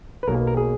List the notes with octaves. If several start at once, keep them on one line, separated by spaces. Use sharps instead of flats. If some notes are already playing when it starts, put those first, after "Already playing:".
B4
B1 B2 A#3 A#4
A#4
G#4